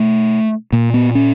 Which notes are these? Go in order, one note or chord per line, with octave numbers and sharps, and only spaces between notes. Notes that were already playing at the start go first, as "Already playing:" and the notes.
Already playing: B2 A3
A#2 A#3
B3
C#4